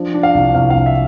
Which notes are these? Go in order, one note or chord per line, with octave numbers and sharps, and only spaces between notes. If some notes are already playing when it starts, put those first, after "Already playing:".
Already playing: F3 D4
D4
F5
C2
C2 F5
F5
C2
E5